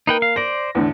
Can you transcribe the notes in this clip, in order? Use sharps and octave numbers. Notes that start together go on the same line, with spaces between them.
A#3 D#4 B4 G5
F5
C5 D5 A#6
E2 A2 D3